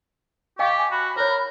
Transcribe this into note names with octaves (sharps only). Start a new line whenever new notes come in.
G4 D#5 F5 G5 C#6
G#5
F#4 B5
A#4 C5 C#5